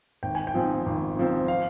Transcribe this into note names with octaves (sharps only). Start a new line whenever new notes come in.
G#1 G5
G#5
G5
G#2 F3 C4
G#1
G#2 F3 C4
F5